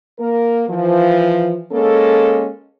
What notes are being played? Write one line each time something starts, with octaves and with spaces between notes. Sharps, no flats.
A#3 A#4
E3 F3
G#3 A#3 C#4 A4